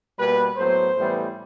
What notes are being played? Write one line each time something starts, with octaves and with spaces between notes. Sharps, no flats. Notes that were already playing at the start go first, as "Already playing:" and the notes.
B2 G3 A#3 B4
A2 F#3 B3 C5
A2 E3 G3 B3